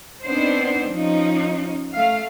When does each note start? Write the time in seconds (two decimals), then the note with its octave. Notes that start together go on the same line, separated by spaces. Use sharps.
0.25 B3 C4 D4 D#4 C5
0.93 F3 C#4 D#4
1.96 A3 F5